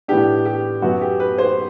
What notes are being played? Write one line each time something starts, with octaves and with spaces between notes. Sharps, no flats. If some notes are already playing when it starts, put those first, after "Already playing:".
A2 E3 B3 D4 G4
G4
F#2 F#3 B3 F#4
G4
B4
C5